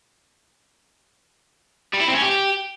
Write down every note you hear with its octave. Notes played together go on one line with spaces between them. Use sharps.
G3
E4
C4
C#4
G4